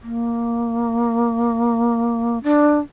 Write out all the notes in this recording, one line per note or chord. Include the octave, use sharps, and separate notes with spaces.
A#3
D4